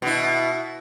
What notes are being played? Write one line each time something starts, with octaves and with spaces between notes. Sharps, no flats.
B2 E4